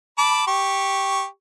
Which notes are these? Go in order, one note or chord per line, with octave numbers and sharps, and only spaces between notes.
A5 B5 D6
G4 C#6